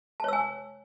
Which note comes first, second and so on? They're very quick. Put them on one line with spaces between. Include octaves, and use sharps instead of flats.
A5 C#5 E6 G#5